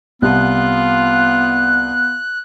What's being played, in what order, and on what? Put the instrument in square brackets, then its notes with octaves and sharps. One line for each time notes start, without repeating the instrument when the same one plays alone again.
[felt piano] C2 [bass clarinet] B3 [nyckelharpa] F4 [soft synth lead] F#6